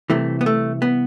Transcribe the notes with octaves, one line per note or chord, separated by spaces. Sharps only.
C2 C3 E3 A3
B3
A3
B3